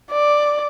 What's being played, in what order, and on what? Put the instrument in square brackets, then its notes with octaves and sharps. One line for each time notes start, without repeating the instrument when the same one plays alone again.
[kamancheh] D5